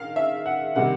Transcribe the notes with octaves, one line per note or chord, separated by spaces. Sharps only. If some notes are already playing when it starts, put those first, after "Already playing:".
Already playing: D#3 F5
E5
F#5
C3 D#3 G3 A#3 F#5